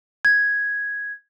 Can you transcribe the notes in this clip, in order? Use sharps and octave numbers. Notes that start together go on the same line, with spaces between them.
G#6